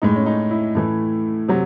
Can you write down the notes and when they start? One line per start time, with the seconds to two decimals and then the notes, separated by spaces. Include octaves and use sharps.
0.02 A2 G#3 D#4
0.16 C#4
0.26 D#4
0.51 E4
0.75 A2 E3 A3
1.48 C3 F#3